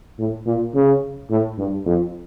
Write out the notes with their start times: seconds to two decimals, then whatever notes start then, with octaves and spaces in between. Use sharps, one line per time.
0.19 A2
0.46 A#2
0.74 C#3
1.30 A2
1.58 G2
1.86 F2